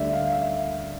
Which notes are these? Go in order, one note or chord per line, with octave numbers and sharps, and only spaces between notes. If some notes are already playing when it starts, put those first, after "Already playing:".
Already playing: D2 D3 G3 D5 E5
F5
E5